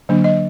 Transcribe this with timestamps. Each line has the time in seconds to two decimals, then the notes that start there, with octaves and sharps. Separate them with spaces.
0.09 D3 F#3 A#3 D4
0.24 D#5